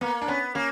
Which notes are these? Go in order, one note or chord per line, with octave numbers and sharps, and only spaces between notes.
A#3 B3
D4
B3 C#4
A#3 C#4